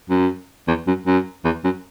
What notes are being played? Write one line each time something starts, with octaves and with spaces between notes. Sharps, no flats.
F#2
E2
F#2
F#2
E2
F#2